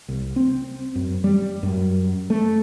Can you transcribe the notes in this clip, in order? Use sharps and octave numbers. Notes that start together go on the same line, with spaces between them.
C2
C4
F#2
G3
F#2
A3